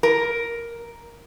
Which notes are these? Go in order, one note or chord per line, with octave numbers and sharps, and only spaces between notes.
A#4